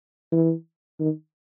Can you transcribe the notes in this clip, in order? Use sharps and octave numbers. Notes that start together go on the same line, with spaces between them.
E3
D#3